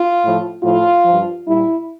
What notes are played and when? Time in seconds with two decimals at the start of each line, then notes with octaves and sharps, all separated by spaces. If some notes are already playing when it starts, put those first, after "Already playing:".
Already playing: F4
0.21 A2 F3
0.62 A2 F3 F4
1.05 G2 F3
1.46 A#2 G3 E4